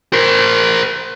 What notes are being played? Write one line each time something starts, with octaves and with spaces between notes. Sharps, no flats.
A#4 C5